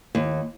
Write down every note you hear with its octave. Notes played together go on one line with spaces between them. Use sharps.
D#2